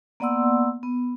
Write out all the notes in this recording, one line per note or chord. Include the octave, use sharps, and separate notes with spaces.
A#3 B3 D5 F#5 C6 E6
B3